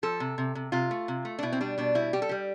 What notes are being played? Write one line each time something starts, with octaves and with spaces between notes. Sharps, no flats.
F3 A4
C3
C3
C3
C3 F4
A3
C3
A3
D4
B2 E4
C4
G3 D4
B2 D4
G3 E4
G3 G4
A4
G3 G4